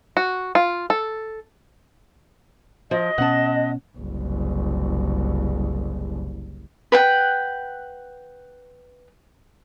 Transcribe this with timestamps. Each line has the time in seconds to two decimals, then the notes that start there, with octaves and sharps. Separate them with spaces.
0.17 F#4
0.55 F4
0.90 A4
2.91 F3 D#5
3.18 B2 C#4 F#5 A5
3.98 F#1 C2
6.92 B4 F#5 G5